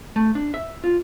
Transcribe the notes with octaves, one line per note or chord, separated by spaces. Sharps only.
A3
D4
E5
F4